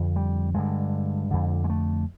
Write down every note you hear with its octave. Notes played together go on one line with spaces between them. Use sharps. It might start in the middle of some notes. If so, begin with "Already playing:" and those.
Already playing: F2 D3
G3
G2 D3 G#3
F2 D3
G#3
A3